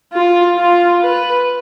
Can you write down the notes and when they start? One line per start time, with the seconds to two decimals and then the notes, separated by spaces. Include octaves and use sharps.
0.13 F4
0.58 F4
1.02 B4